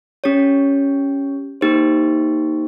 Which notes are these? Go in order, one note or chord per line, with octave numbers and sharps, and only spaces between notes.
C#4 G4 C#5
A#3 D#4 G4 C5